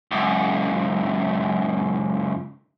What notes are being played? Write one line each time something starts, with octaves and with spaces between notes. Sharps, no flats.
C#2 F#2